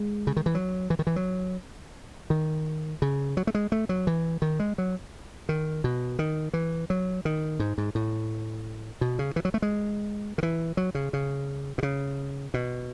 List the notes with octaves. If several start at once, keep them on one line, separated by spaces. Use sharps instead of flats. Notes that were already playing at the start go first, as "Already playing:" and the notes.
Already playing: G#3
C#3
D#3
E3
F#3
E3
D#3
E3
F#3
D#3
C#3
F#3
A3
G#3
A3
F#3
E3
D#3
G#3
F#3
D#3
B2
D#3
E3
F#3
D#3
G#2
G#2
A2
B2
C#3
E3
F#3
A3
G#3
D#3
E3
F#3
C#3
C#3
B2
C#3
B2